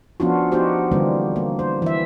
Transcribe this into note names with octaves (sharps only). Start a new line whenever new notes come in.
F3 B3 C#4 D4 F4 F#4
B3 D#4 F#4 G4 C5
D3 E3 G3 A#3 C4
A#3
C5
E3 E5